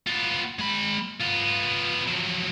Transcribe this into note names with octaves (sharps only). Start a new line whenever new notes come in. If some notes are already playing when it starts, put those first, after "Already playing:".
B3 F4
G#3 B5
B3 F4
F3 F#3